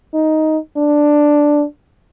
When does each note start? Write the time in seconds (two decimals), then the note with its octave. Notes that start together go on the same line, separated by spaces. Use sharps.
0.14 D#4
0.77 D4